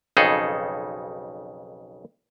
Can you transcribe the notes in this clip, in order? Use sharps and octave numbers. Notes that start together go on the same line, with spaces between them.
B1 F2 C#3 D#4 G#4 A4